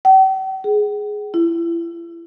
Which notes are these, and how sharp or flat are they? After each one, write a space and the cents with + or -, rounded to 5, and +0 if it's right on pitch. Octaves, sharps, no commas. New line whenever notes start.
G5 -45
G#4 +5
E4 +40